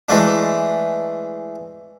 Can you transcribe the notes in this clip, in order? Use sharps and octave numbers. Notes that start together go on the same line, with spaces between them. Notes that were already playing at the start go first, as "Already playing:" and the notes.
E3 G#3 A3 D4